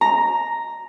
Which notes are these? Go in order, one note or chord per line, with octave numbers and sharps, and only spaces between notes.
A#5